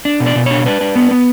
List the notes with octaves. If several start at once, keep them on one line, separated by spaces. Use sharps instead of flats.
D4
B2
D5
B2
D4 C#5
D4 B4
D4
B3
B3